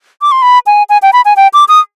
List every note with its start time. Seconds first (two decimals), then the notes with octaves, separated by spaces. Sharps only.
0.22 D6
0.32 C6
0.42 B5
0.67 G#5
0.89 G#5
1.02 G5
1.13 B5
1.25 G#5
1.37 G5
1.54 D6
1.68 D#6